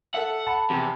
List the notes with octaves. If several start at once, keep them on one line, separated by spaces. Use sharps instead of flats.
A4 E5 F#5
A5 B5
E2 C3